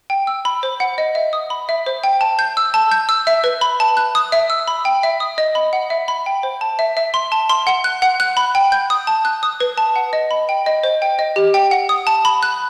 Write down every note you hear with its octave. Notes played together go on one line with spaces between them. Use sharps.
G5
E6
B5
C5
F#5
D#5
E5
D#6
B5
E5
C5
G5
A5
G6
E6
A5
G6
E6
E5
B4
B5
A5
F#6
D#6
E5
E6
B5
G5
E5
D#6
D#5
B5
F#5
E5
B5
G5
C5
A5
E5
E5
C6
A5
C6
F#5
F#6
F#5
F#6
B5
G5
G6
D#6
A5
F#6
D#6
B4
A5
F#5
D#5
B5
G5
D#5
C5
G5
D#5
G4
G5
F#5
D#6
A5
B5
F#6